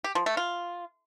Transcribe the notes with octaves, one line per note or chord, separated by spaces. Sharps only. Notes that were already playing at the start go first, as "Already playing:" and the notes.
G4
F3
A3
F4